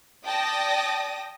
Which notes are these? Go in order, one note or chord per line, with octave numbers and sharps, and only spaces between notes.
D5 G5 A5 D#6 A#6